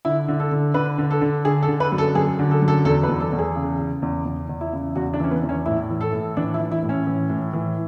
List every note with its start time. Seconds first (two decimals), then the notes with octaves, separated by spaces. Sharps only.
0.05 D3 E4
0.28 D3
0.40 A4
0.51 D3
0.74 D3 B4
0.98 D3
1.11 A4
1.21 D3
1.45 D3 G#4
1.62 A4
1.68 D3
1.80 B4
1.92 F#2
1.98 A4
2.15 F#2 G#4
2.39 D3
2.51 A4
2.62 F#2
2.68 A4
2.85 E2 A4
3.03 B4
3.09 E2
3.20 A4
3.32 E2
3.39 G#4
3.56 C#3
3.79 C#3
4.02 E2
4.25 E2
4.49 E2
4.61 E4
4.73 C#3
4.95 E2 F#4
5.14 D4
5.20 E3 C#4
5.31 B3
5.43 E2
5.49 C#4
5.66 A2 E4
5.90 E3
6.01 A4
6.13 A2
6.37 E3 D4
6.54 E4
6.60 E3
6.72 E4
6.83 A2
6.89 C#4
7.07 E3
7.30 A2
7.53 E3